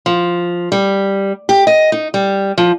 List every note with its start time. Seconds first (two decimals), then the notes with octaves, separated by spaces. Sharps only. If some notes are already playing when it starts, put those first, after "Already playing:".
0.06 F3
0.72 G3
1.49 G4
1.67 D#5
1.92 D#4
2.14 G3
2.58 F3